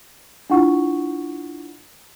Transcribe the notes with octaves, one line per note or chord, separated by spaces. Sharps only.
D4 E4 F4 F#5 C#6